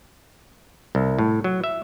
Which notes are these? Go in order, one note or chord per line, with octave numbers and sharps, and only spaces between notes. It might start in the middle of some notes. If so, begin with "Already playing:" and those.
C2
A2
F#3
E5